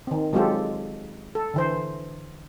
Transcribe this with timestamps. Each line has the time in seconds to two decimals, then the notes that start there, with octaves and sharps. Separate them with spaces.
0.07 D#3 C4
0.33 F#3 G#3 C4 F4 G4 A4
1.35 A4
1.54 D3 E3 C5